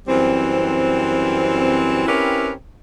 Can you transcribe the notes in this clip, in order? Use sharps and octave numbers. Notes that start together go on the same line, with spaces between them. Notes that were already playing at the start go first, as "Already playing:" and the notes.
F#2 E3 G3 C4
C4 C#4 E4 G4 A#4 B4